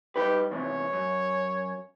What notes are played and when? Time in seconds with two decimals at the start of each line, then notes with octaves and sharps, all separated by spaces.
0.16 G3 D#4 G4 B4
0.51 E2 G#2 C3 C#5
0.93 F#2